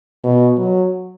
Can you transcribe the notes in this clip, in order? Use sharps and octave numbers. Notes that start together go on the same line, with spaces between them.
B2
F#3